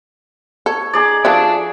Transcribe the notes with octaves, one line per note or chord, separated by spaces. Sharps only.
A4 C#5
D#4 G#4 D5
F3 F#4 A4 D5 E5 A5